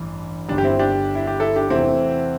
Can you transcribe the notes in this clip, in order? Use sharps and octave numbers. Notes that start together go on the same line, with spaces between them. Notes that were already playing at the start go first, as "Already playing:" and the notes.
Already playing: A1 G2 E3
G1 G2 G3 D4
G4
C4 E4
D4 G4
E4
G4
E4 A4
D4 G4
E2 C3 E3 A3 C4 E4